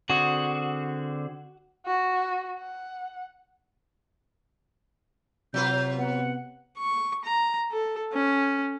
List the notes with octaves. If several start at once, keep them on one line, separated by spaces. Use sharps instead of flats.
D3 C4 F#4 G#4
F#4
F#5
C3 F#3 F4 B4 G6
B3 F#5
C#6
A#5
A4
C#4